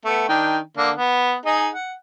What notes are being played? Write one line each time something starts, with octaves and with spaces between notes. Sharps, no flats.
A3 B3
D#3 D4 G5
D3 A#3 D4
B3
D#4 G#4 D#5
F#5